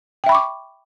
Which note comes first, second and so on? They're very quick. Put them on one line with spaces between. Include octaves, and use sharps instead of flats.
G5 E5 B5 C#6 D6